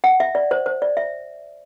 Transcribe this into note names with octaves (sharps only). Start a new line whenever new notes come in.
F#5
E5
D5
C5
C5
D5
E5